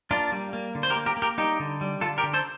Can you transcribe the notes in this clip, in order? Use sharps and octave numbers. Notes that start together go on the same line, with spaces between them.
A#3 D4 F4
G3
A#3
D3
C5
G4 A#4
A#3
G4 A#4
A#3
G4 A#4
G3 D#4 G4
D3
G3
D3 F4 A4
G4 A#4
D3
A4 C5